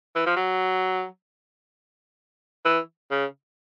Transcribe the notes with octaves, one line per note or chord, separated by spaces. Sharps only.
E3
F3
F#3
E3
C#3